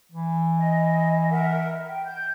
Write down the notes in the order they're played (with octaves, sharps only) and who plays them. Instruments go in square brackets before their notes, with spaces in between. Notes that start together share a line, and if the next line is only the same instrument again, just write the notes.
[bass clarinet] E3
[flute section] D#5
A#4 E5 F#5
G5
G6